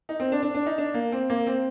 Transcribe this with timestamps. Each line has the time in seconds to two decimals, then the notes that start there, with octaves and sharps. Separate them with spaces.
0.09 D#4
0.20 C4
0.32 D4
0.43 D4
0.54 D4
0.66 D#4
0.78 D4
0.94 A#3
1.12 C4
1.30 A#3
1.47 C4